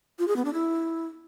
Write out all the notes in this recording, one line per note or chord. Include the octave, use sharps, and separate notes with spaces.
F4
G#4
B3
D4
E4